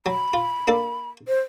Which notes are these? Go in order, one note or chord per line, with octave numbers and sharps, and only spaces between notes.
F#3 B5
F4
A#3 D4 A4
C5